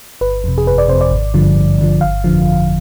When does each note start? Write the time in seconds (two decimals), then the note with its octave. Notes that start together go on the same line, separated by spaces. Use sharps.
0.21 G1 B4
0.44 F2 C3
0.58 G#4
0.66 G1 B4
0.78 D5
0.89 C3 C5
0.93 F2
1.01 D5
1.11 G#1
1.34 G2 D3 F3
1.56 G#1
1.78 G2 D3 F3
2.01 G1 F5
2.24 F2 D3 F3
2.46 G1